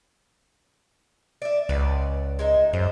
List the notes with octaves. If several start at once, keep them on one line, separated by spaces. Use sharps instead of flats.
D5 E5
C#2 B4 D5 F#5
G#3 D#4 E5
F#2 C5